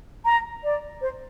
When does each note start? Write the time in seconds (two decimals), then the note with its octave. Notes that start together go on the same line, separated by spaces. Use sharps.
0.25 A#5
0.63 D5
1.01 C5